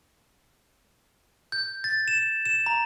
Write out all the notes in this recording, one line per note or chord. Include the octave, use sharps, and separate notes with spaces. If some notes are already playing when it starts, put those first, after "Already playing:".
G6
A6
E7
E7
A#5